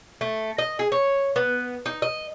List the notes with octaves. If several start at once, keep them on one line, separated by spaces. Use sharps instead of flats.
A3
D#5
G#4
C#5
B3
D#4
D#5